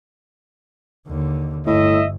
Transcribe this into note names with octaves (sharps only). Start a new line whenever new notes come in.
D#2 D3
G1 A2 D#5 E5